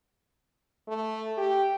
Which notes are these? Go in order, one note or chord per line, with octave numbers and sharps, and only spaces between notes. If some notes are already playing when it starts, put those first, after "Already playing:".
A3
G4